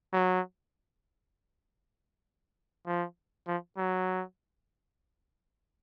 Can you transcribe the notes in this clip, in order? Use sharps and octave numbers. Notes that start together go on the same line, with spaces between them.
F#3
F3
F3
F#3